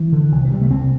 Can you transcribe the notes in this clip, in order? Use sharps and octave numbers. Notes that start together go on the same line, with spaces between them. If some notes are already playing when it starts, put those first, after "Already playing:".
Already playing: E3
D3
C2
E3
C3 G3
A3
C2 C4